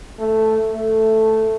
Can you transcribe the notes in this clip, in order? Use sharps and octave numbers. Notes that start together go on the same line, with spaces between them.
A3
A3